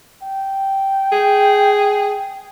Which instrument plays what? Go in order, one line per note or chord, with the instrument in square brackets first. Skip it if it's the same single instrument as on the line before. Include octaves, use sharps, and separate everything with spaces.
[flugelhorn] G5
[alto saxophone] G#4